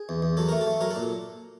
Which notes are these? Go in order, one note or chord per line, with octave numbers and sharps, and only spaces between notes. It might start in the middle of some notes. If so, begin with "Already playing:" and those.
Already playing: G#4
E2
E2
F#3 A4
A3 A#4
A4
A3
F#3 A#4
A4
A#2